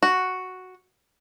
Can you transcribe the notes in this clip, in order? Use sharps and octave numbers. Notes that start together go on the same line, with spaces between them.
F#4